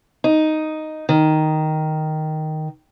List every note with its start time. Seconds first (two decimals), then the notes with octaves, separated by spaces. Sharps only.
0.24 D#4
1.09 D#3